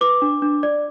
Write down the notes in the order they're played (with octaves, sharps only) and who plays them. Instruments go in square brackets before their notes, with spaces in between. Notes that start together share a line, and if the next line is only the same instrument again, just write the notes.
[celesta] B4 D6
D4
D4
D5